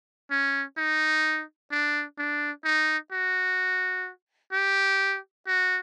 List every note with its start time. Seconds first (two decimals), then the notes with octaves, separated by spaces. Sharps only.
0.31 C#4
0.77 D#4
1.71 D4
2.18 D4
2.65 D#4
3.12 F#4
4.53 G4
5.47 F#4